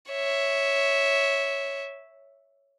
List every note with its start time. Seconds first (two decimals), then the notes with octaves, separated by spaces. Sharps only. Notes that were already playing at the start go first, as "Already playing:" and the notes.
0.10 C#5 E5